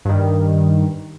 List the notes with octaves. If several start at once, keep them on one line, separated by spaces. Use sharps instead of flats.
G2 D#3